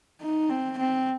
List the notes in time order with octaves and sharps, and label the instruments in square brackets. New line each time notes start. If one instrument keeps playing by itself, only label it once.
[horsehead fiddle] D#4
C4
C4